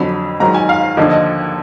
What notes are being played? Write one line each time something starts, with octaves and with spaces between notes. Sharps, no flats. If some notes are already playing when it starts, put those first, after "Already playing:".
Already playing: F2 D3 F#3 B5
G#2 D#3 F#3 A#5
G#5
F5
D#2 D3 F3 D#5
D#5